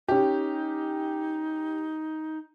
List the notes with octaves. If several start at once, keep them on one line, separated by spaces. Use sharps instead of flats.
C#4 D#4 G4